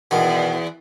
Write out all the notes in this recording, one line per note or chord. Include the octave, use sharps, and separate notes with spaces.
E2 B2 D#3